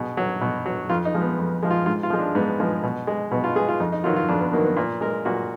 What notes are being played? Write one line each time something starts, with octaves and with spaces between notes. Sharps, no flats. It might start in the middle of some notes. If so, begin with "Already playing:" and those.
Already playing: B2 G#4
F#3
B2
F#3
F2 F4
D#4
F3 G#3
B3
F2
F3 G#3
F4
G#2 F4
F4
F3 G#3
D4
G#2 B3
F3 G#3
B2
G#3
B2 B3
F4
G#3 G#4
F4
F2 D#4
D#4
D#3 F#3 F4
F4
F2 D4
B3
D#3 F#3 A#3
B3
A#2
G#3 A#4
A#2 F#4